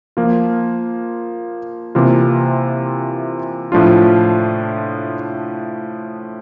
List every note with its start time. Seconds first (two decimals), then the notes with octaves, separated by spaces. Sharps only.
0.17 F3 A#3 F4
1.95 C3 E3 A#3 F4
3.72 A2 F3 A3 D4 F4